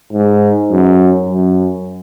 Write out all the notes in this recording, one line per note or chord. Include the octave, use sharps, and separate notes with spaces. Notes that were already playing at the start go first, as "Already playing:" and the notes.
G#2
F#2
F#2